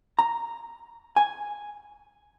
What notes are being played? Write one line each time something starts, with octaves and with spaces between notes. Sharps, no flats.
A#5
G#5